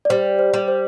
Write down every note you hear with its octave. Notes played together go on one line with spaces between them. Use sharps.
D5
G3 C5
C5
G3 D5
C5